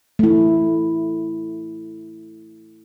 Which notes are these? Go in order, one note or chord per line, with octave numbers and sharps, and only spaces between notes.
A3 E4